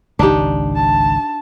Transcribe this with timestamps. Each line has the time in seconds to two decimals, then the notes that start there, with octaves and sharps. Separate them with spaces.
0.19 G#1 C#2 D4 D#4 G4
0.76 A5